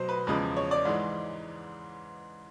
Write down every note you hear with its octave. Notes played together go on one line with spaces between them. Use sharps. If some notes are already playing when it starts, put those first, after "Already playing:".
Already playing: B2 F#3 C5
B4
E2 C#3 F3 G#3 B4
C#5
D5
G#2 E3 G#3